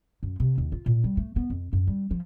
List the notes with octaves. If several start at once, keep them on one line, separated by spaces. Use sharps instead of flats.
F#2
C3
D#2
F4
A#2
G3
A3
B3
F2
F#2
G3
F3